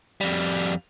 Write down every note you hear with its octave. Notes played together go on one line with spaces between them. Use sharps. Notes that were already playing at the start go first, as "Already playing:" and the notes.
F2 G3